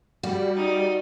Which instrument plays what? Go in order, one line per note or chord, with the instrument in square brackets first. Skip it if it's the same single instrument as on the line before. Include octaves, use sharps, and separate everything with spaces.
[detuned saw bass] G3 [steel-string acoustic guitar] F#4
[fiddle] D#4 D5